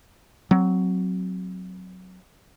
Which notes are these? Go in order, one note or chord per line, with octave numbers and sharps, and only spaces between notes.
F#3 C4